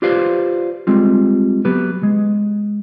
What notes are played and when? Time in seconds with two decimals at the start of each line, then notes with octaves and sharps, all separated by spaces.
0.02 F4 G4 B4 C5 D5 F5
0.87 G3 G#3 C4 F4
1.65 F#3 B3 G4 B4
2.03 G#3